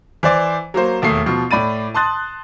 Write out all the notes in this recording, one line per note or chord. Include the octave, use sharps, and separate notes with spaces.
E3 C5 D5
F#3 A#3 C5
E1 D#2 A3 D#6 C7
B2 F3
A2 D5 B5 A6 D#7
A5 C6 D#6 F#6 A6